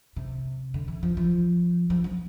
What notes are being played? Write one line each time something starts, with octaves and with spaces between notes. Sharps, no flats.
C3
D3
E3
F3
F3
F3
F3